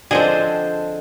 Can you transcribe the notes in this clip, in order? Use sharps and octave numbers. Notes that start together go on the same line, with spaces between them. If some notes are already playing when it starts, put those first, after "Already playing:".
D3 F3 C4 D4 G#4 C5 D#5